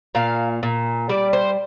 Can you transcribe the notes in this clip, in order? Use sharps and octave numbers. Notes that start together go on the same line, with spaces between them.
A#2 F5
A#2
G3 D5
C5